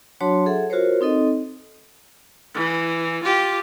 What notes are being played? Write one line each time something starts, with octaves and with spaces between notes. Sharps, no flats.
F#3 D4 F#4 C#5 A5 C6
G#4 A4 E5 F#5
F4 F#4 A#4 C5 C#5
C4 D#4 A4 D#5
E3
F4 G4